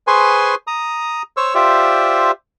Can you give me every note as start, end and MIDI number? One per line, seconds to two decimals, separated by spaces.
0.07 0.55 68
0.07 0.55 71
0.07 0.55 72
0.07 0.55 80
0.07 0.55 84
0.07 0.55 85
0.67 1.22 82
0.67 1.22 87
1.37 1.54 72
1.37 1.54 73
1.37 1.54 85
1.37 1.54 88
1.55 2.31 65
1.55 2.31 67
1.55 2.31 72
1.55 2.31 74
1.55 2.31 76